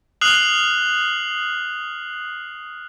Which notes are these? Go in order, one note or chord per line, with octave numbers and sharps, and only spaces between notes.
D#6 F6 F#6 C7 F#7